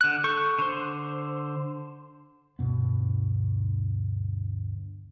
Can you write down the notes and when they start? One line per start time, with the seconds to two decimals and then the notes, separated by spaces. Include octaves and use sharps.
0.01 D3 F#6
0.24 A4 C#6 G6
0.59 D3 C5
2.59 D2 G2 B2 B3